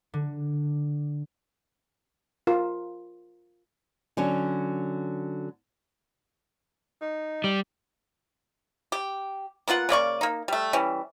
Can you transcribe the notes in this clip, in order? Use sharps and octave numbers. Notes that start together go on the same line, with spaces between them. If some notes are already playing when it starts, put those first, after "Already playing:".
D3
F4 A#4
D3 F#3 C#4
D#4
G3
G4
A#3 B3 F4 F#5
C#3 A#3 D5 C#6
A#3 D#4
G3 A3
E3 G3 C#4